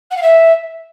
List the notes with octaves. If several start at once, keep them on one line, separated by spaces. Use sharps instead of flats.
F#5
F5
E5